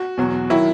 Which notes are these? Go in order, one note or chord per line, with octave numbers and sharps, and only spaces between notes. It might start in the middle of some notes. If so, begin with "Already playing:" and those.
Already playing: F#4
E2 B2 F#3
D#3 F#3 E4